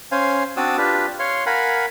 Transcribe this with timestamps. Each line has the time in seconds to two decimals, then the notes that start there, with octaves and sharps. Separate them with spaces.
0.12 C#4 C5 F5 G#5
0.57 C4 D4 F#4 D5 D#6 E6
0.78 D4 F4 G4 B4
1.19 C#5 F5 C6
1.46 A#4 F5 F#5 G#5 B5